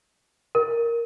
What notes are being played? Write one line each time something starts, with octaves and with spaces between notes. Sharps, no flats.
A#4